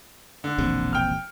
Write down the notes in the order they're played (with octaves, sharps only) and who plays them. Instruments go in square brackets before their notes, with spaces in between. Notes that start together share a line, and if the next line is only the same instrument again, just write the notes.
[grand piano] D3
[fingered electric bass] E1 A#1 C3
[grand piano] G5 F6